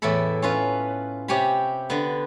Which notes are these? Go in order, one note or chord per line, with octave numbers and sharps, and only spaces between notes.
E2 A2 E4 A4 B5
C#4 F4 B4
C3 G4 C#5 G#5 B5
D3 B3